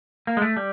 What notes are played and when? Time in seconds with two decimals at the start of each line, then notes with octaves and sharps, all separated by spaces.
0.27 A#3
0.37 G#3
0.42 A3
0.57 G3